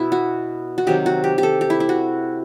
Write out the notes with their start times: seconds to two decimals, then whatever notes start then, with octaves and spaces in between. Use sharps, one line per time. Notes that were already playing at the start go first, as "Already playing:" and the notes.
Already playing: B2 E4
0.12 F#4
0.78 F#4
0.87 C3 D#3 F#3 G4
1.06 F#4
1.24 G4
1.38 G4
1.43 A4
1.61 G4
1.70 E4
1.80 E4
1.89 F#4